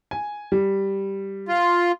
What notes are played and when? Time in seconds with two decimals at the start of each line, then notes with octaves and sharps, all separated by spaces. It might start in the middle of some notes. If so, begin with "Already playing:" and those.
0.11 G#5
0.52 G3
1.49 F4